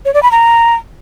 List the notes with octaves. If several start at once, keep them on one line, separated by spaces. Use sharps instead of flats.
C#5
D5
B5
A#5